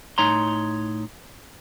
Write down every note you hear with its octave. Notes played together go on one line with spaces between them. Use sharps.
A2 D#4 C#5 A#5 C6